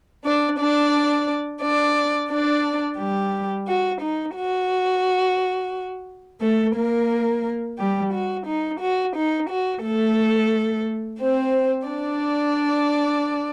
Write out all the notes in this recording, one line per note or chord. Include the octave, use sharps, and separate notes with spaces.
D4 D5
D4 D5
D4 D5
D4 D5
G3 G4
F#4
D#4
F#4
A3 A4
A#3 A#4
G3 G4
F#4
D#4
F#4
D#4
F#4
A3 A4
C4 C5
D4 D5